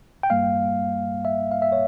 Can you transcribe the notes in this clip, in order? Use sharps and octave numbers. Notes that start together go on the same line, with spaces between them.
G5
G2 G3 A#3 F5
E5
F5
E5
C#5